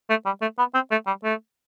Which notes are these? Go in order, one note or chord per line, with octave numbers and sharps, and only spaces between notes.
A3
G3
A3
B3
C4
A3
G3
A3